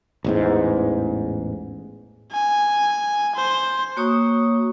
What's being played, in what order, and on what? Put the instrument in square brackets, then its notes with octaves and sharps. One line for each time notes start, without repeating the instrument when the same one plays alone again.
[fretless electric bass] A1 E2 G#2
[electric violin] G#5
C5
[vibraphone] A#3 F#4 C#5 C#6 D#6